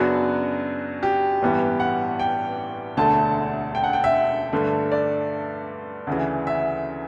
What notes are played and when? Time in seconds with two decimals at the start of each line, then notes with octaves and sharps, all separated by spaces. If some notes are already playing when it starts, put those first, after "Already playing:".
Already playing: F#2 C#3 F#3 B3 D4 F#4
1.03 G4
1.42 A1 G2 E3 G3 B3
1.80 F#5
2.19 G5
2.97 E1 D2 D3 A3 A5
3.75 G5
3.84 F#5
3.93 G5
4.04 E5
4.53 G2 D3 A3
4.92 D5
6.07 D2 C#3 E3
6.47 E5